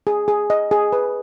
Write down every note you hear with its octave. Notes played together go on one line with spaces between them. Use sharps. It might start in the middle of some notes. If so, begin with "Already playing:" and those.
G#4
G#4
D#5
G#4
B4